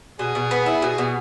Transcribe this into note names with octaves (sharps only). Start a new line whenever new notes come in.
B2 G#4
B2
B3
E4
B2
B2